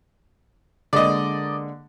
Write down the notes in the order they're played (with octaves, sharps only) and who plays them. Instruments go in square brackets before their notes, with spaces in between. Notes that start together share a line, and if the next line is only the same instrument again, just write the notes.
[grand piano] D3 G#3 A#3 [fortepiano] D5 D#5